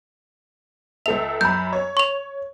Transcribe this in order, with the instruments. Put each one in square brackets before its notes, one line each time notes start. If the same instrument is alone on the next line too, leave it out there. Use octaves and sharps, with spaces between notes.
[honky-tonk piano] C#2 A4 E5 [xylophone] F7
[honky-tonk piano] F#2 B5 [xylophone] G6
[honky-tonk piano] C#5
[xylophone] C#6 F7